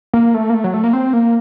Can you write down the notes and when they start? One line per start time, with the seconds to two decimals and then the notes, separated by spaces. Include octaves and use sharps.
0.13 A#3
0.34 A3
0.50 A#3
0.54 A3
0.64 F#3
0.74 A3
0.84 A#3
0.93 C4
1.13 A#3